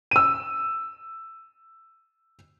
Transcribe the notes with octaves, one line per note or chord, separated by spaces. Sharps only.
E6 D#7